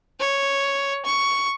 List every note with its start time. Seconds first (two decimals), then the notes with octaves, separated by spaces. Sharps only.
0.19 C#5
1.05 C#6